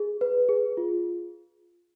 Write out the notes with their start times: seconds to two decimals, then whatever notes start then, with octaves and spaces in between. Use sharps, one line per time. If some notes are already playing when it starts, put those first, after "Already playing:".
Already playing: G#4
0.21 B4
0.49 G#4
0.77 F4